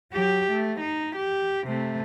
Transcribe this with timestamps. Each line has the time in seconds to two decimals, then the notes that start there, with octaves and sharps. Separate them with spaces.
0.13 F#3 G4
0.51 A3
0.80 D#4
1.16 G4
1.67 C3 A3